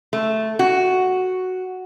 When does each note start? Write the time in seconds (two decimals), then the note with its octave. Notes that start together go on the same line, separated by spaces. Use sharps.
0.13 A3
0.59 F#4